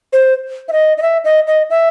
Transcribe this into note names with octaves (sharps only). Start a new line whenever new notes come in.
C5
E5
D#5
D#5
E5
D#5
D#5
E5